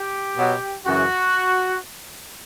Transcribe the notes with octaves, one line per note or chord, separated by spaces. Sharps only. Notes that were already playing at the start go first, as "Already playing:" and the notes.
Already playing: G4
B2 F#3
F#2 C#3 E3 F#4